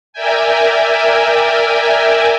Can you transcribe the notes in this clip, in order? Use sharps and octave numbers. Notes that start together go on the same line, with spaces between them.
A#4 D5 E5 G5 G#5